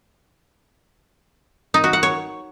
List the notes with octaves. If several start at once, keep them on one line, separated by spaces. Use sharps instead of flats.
D#4
F#4
F#5
C#5